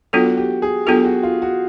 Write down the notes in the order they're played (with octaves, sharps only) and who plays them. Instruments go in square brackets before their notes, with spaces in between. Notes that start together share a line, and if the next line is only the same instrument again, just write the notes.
[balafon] F#3 B3 D4 F4 A4 [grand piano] F#4
[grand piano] G4
G#4
[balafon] F#3 B3 D4 F4 A4 [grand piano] G4
[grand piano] F#4
F4
F#4